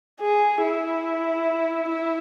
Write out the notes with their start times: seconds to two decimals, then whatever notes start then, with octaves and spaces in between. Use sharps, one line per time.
0.21 G#4
0.63 E4
1.89 E4